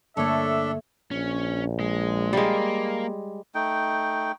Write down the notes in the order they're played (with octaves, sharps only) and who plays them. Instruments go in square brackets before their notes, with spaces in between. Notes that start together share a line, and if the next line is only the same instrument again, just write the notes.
[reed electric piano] G2 D3 A#3 [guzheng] A3 C#5 [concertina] D4 A4 [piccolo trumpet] E5
[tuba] A#1 [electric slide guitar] C#4
[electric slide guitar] G#3
[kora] G3 G#3 [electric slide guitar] A#3
[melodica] A3 D#4 G5